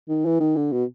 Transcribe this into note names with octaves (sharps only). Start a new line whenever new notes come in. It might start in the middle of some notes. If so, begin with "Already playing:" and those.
D#3
E3
D#3
D3
B2